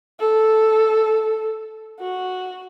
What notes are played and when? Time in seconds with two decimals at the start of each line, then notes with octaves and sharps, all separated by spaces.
0.20 A4
2.00 F#4